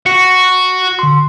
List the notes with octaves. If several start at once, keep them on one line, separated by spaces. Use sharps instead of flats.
F#4 C#7
D3 C6